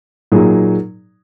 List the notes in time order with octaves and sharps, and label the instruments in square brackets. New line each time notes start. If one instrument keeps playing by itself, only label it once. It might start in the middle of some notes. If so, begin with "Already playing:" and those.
[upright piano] A#2 F#3 D#4 G#4